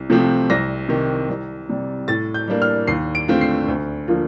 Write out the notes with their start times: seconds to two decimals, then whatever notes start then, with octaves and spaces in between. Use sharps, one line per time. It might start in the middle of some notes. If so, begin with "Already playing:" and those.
Already playing: C2
0.10 C3 F3 A3 C4
0.50 C2 A#6
0.89 C3 D#3
1.29 C2
1.69 C3 G3
2.08 A2 A6
2.34 G6
2.48 G3 A#3 D4
2.62 F6
2.88 D#2 C7
3.15 D7
3.28 D3 A3 C4 F4
3.41 C7
3.68 D2
4.08 D3 F3 A#3 F4